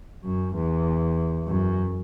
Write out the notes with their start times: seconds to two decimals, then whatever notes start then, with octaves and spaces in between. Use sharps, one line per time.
0.24 F#2
0.55 E2
1.47 F#2